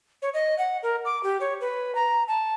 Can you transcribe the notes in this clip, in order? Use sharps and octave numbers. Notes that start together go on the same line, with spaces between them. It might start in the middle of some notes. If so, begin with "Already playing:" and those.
C#5
D#5
F#5
A#4
D6
G4
C#5
B4
A#5
A5